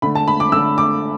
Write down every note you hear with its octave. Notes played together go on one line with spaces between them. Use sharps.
D3 A3 B5
A5
B5
D6
D3 A3 E6
D6